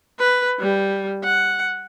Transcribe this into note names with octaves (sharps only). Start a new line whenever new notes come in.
B4
G3
F#5